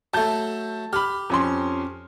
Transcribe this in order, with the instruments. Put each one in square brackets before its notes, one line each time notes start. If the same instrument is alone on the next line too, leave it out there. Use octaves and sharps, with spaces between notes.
[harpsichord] F#3 A3 [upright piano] A5 G6
[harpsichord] G4 [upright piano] B5 F6
[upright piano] F2 C#4 C6